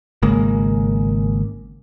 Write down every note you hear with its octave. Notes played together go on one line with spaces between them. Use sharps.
G#1 C#3 G#3 A#3